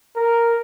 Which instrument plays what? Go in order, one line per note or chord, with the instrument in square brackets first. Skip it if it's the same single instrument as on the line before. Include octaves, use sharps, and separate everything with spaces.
[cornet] A#4